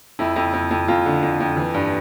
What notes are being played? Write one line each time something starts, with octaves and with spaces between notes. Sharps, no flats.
F2 E4
F2
F2
F2
F2 F4
D3
F2
F2
E3
G2